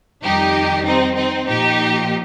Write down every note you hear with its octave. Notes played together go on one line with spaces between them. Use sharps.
F2 D#3 G3 D#4 G4
C4 D#4
C4 D#4
A#2 F3 D#4 G4